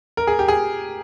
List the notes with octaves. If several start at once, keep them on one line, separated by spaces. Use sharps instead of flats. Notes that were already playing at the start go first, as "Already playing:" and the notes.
A#4
G#4
G4
G#4